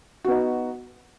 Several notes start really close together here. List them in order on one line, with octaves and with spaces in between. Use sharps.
F#4 B3 D#4